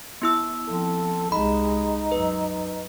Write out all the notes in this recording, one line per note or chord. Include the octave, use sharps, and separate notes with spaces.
B3 E4 E6
F3 C4 A4
C2 G#3 D#4 B5
F#2 B4